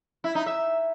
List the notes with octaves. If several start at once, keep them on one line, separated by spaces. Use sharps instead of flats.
E4
D#4
E5